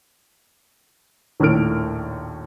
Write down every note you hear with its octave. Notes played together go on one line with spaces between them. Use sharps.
A#1 D#2 A2 A3 F6 D7